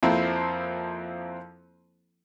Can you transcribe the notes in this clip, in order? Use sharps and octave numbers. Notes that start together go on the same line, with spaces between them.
F2 F3 A#3 C4 E4